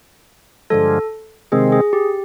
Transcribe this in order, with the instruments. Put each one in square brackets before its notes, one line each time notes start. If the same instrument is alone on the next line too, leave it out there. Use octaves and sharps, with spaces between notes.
[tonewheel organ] G2 D3 F3 G#3 [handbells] A4
[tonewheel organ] C3 D#3 G#3 C4 [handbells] G#4
[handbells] G#4
G4